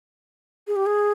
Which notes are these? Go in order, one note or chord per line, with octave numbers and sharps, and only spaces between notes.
G#4
G4
G#4